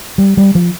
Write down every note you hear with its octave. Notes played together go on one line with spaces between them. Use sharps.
G3
G3
F3